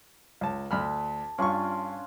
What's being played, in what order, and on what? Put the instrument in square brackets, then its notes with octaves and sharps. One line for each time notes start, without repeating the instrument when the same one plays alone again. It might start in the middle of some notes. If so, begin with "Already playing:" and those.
[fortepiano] C#2 A5
[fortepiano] D2 B5 F6 [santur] A5
[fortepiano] G2 C#6 [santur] C#4 D4 F4